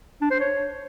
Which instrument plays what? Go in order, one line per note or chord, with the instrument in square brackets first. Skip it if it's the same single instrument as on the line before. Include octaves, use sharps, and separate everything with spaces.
[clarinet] D4
C5
C#5